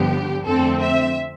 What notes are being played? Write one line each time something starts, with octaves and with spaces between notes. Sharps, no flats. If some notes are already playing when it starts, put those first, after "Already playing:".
Already playing: G1 G2 D3 F3 B3 G4
F2 D3 F3 A3 C4 A4
E5